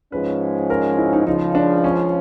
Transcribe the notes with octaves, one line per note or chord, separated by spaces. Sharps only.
G#2 F3 G#3 C#4 B4
A#4
E4
D#4
C#2 C#3 F3 D#4
D4
C#4